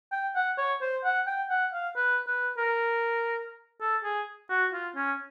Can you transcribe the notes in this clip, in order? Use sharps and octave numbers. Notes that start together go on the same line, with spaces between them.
G5
F#5
C#5
C5
F#5
G5
F#5
F5
B4
B4
A#4
A4
G#4
F#4
F4
C#4